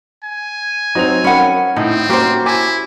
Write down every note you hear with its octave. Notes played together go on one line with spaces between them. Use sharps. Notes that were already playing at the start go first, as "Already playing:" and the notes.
G#5
F#3 C4 D#4 F#4 F7
C#4 A#4 F#5 G5 B5
A2 C4 D#4
A#3 C#4 F#4 G4 C5 C6
E4 G#5 D6